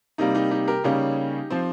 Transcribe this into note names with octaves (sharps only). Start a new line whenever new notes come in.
C3 G3 A#3 D#4
D#4 G4
D#4 G4
G4 A#4
C#3 G3 A#3 C#4 D#4 G4
F3 C4